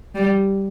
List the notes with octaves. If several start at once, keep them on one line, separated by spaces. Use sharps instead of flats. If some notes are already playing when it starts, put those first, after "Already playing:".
G3